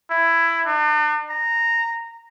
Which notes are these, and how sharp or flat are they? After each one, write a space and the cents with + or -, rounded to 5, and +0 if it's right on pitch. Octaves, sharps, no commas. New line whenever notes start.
E4 +15
D4 +45
A#5 -10